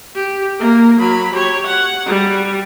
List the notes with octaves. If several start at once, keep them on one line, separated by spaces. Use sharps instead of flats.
G4
A#3
F#3 B5
G4 C#5
F#5
G3